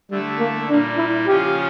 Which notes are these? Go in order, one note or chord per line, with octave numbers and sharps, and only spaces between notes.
D3 G3 A3 E4
A#3
A#2 G3 A#3 D4
E4
C#3 F3 C#4 F4 G4